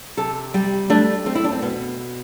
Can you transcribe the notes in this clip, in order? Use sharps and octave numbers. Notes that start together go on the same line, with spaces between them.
C3 A4
G3 G4
A3 D4
A3 C4
E4
D4
C4
B2 B3